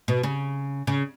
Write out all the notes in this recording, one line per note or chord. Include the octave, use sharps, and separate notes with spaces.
B2
C#3
C#3